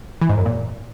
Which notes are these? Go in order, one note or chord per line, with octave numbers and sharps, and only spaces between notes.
E3
G#2
F#2
A#2